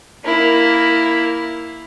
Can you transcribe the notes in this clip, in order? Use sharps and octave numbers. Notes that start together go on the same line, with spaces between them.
A#3 E4